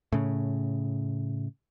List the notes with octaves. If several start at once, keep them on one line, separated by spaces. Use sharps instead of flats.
A2 C#3